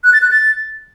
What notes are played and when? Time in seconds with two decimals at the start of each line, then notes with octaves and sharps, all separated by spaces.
0.04 F#6
0.13 A6
0.22 F#6
0.31 A6